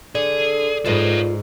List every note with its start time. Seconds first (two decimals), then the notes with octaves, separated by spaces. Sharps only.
0.15 D3 G#4 D5
0.85 G#2 F4 A4 B4 C#5 D#5